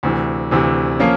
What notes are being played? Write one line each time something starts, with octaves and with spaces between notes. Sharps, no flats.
D2 C3 E3
D2 C3 E3
F3 A#3 C#4 F4